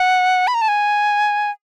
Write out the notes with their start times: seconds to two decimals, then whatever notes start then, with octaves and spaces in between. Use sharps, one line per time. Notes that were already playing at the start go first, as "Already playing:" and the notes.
Already playing: F#5
0.47 B5
0.54 A#5
0.61 A5
0.68 G#5